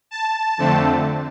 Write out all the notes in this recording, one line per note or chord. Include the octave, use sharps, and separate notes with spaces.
A5
F2 D3 A3 C4